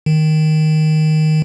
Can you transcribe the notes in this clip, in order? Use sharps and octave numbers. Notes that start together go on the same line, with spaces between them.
D#3